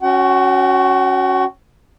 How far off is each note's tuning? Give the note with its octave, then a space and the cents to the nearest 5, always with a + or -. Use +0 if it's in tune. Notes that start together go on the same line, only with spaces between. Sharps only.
C#4 +0 F#4 +0 F#5 +40